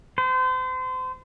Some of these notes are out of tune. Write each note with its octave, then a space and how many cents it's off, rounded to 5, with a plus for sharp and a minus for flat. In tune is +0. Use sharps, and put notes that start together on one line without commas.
C5 -35